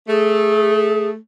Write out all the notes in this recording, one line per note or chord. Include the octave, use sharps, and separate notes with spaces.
A3 G#4